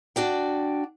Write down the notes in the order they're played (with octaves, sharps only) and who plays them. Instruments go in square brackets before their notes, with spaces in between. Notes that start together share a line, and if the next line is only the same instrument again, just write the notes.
[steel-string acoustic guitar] D4 F#4 D5 G5